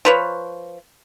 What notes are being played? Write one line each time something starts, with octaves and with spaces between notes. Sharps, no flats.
F3 B4 C#5